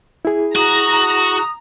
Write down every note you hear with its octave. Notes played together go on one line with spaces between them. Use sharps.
E4 G#4
F#4 A#5 D#6